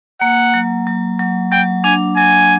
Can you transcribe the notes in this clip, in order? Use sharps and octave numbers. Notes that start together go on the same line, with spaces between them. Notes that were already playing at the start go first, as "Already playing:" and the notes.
A#3 F#5
F#3
F#3
F#3
F#3 G5
D4 G#5
F#3 G#5